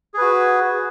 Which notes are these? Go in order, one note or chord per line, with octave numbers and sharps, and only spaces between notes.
F#4 G#4 B4